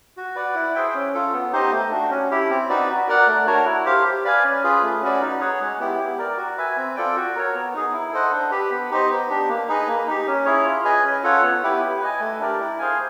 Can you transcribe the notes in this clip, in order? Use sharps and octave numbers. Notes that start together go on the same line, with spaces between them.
F#4
B4 D5 F#5
E4
G#4 C5 E5 G5
C#4
F4 A4
B3
D#4 G4 C5 D#5
A3
D4 F#4
C#4
E4 G4
C4
D#4 F#4 B4 D5
F#4
A#4 D5 F#5
A3
D4 F#4 A#4 C#5
E4
G4 C5 F5
G4
B4 D5 F5 G#5
C#4
F4 G#4 B4
A3
C#4 F#4 B4 D5
D#4
G#4 C#5 F#5
G#3
B3 E4 G4
G4
A#4 D5
F#4
B4 E5 G#5
C4
F4 A4 D5 G5
F#4
A#4 C#5
B3
D#4 G#4
E4
A4 C5 D#5 F#5
D4
G4 B4
B3
D#4 G4 C5 D#5
B3
D4 G4
A#3
D#4 G#4 B4 D#5
A#3
D#4 G4
C#4
E4 G#4 C#5
F4
G#4 B4 D#5 G#5
C#4
F4 A4 C#5 F#5
B3
E4 G4 B4
G4
B4 D#5 G#5
A3
D4 G4 A#4 D5
E4
G#4 C5 F5 G#5